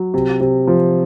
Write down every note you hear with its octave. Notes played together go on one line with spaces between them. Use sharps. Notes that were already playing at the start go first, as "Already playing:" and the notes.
Already playing: F#3
C3
C3
F3